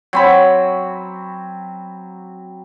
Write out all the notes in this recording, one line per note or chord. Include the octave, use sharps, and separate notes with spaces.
F#3 C4 B5